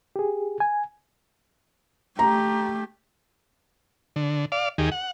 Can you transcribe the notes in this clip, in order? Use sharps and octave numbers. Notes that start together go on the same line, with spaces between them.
G4 G#4
G#5
A3 G4 A#5
D3
D5 F5
D#2 D#3 G4 G#4
F#5